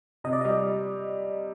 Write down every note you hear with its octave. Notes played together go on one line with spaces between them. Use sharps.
C3 D#5
D5
G3 D#5